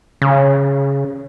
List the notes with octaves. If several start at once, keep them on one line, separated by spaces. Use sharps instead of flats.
C#3